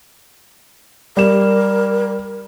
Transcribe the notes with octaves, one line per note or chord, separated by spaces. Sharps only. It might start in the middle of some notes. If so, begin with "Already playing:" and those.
G3 A#4 E7